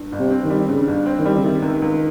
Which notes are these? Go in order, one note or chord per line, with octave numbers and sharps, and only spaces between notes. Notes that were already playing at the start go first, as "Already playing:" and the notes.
Already playing: G2
G1
C3
C4
D#3
G3
G2 C#3
G1
C4
D#3
G3
C#3
C3 D#3
C#2
C#2